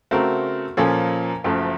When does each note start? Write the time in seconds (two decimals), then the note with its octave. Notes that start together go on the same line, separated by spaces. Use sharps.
0.11 C#3 A3 C4 F#4 A#4
0.77 A#2 F3 A#3 C#4 A4
1.44 F#1 F#2 F3 A3